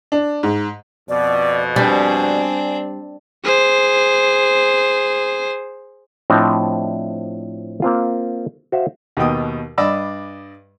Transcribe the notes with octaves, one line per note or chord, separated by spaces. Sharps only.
D4
G#2
F2 B2 D5
G3 C4 D4 G#5
G#4 C5
A2 F3 C4 D4 D5 D#5
A#3 C4 F4
F#4 C5 E5 F5
D#2 B2 B3 G5 D#6
G2 D5 D#5 B5 E6